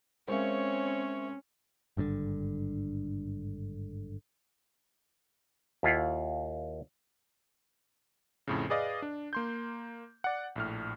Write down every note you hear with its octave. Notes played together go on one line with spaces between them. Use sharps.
G#3 C4 C#4 A#4 C5 C#5 E5 F5
G#1 G2 B2 D3
D#2 E4 F4 F5 F#5
F2 A2 C#3
G#4 B4 D5 D#5 F5
D4
A#3 C6 G6
D5 F#5
A#1 A2 F6